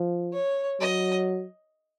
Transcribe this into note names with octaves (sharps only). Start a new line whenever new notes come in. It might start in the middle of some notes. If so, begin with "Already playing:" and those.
Already playing: F3
C#5
F#3 D#5